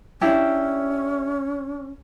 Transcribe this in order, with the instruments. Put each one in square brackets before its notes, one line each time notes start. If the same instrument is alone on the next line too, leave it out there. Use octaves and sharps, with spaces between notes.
[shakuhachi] C#4 [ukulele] D4 E4 G4